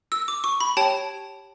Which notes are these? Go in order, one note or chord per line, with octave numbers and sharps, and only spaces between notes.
E6
D6
C#6
B5
G4 C#5 G5 A5